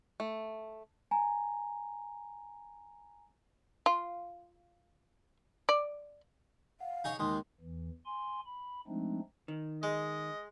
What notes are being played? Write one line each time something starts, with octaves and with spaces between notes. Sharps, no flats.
A3
G#5 A#5
F4
D5
F5 F#5
D#4 G#4 C#5
D#2 G#3 D#4 A#4 C6 D#6
E2 E3
G#5 C6
B5
F3 G#3 A3 C4 D4 D#4
D#3
G#3 D#5